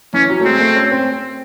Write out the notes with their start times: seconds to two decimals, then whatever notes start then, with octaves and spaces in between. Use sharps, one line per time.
0.13 E3 C#4
0.29 F#3
0.40 A3
0.45 G#3 C4
0.60 A3
0.76 C#4
0.91 C4